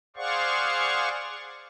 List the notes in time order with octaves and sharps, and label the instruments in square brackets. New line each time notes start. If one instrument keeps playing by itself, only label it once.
[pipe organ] G#4 C5 D5 F5 F#5 C#6